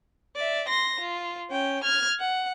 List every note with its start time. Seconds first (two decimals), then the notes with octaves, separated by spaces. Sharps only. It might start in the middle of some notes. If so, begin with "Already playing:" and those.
0.36 D5 E5
0.68 C6 A#6
1.00 F4
1.50 C#4 G5
1.84 F6 G#6
2.20 F#5